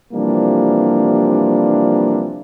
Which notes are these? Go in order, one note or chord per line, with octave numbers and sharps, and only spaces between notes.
C3 E3 F3 G3 A#3 D4